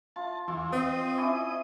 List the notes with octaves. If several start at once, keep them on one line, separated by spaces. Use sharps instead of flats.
F4 A5
E2 E3 F4
C4 D#5 D#6
C#4 E4 D5